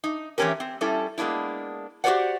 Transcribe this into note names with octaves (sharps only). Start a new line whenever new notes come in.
D#4
E3 A3 C4 C#4 G4 A#4
C4
G3 C#4 E4 A4
G#3 A#3 B3 D4 E4
F#4 G4 B4 C5 D5 F#5